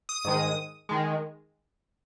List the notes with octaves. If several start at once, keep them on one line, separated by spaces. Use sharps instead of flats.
D#6
G#2 D#3 G#3
D#3 G#3